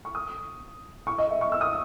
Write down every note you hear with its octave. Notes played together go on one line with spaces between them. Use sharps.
C#6
D#6
C#6
D#5
E5
C#6
E6
D#6